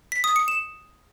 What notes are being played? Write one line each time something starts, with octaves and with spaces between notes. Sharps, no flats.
B6
D#6
C#7
E7